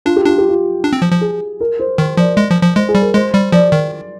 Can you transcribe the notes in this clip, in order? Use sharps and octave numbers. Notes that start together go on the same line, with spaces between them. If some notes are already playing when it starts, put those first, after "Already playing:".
D4 F4
G4
D4 F4
G4
F4
D4
C4
F3
F3
G#4
A#4
C5
D#3 C5
F3 D5
G#3
F3
F3
G#3 C5
G#4
G3
A#4
G#3 C5
G3
F3 D5
D#3